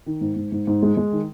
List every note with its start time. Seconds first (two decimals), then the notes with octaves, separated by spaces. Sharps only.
0.06 D#3
0.21 G#2
0.36 G#2
0.52 G#2
0.67 G#2
0.83 G#3
0.97 G#3
1.12 D#3